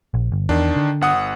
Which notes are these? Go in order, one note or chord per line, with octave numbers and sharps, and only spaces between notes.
A#1
G1
E2 D#3 D4
D3
G1 F#5 D#6